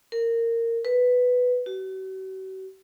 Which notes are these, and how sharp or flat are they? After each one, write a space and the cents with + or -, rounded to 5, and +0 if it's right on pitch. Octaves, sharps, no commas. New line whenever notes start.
A#4 -15
B4 +5
F#4 +45